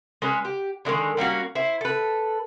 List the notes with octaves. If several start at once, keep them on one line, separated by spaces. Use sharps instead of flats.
G#3 C#4 B4
G4
D3 D#3 F#3 G#3
G3 A#3 C#4 F#4
E4 C5
A4 B4